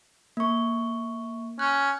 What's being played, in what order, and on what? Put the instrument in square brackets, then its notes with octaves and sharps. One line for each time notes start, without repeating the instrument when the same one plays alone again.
[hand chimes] A#3 C#6
[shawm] C#4 [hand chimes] F#6